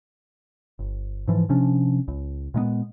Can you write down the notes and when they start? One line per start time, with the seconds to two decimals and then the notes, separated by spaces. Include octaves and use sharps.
0.79 G1
1.28 G#2 E3 F3
1.49 C3 F3 C#4 D4
2.08 C#2
2.54 A#2 G#3 A3 B3